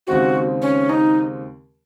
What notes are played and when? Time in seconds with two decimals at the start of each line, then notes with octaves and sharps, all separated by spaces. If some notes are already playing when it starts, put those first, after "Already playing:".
0.07 D#2 C#3 G#3 C4 F#4
0.62 C#4
0.89 D#4